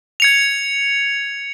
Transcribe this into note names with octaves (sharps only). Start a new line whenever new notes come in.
G#6 C#7 F7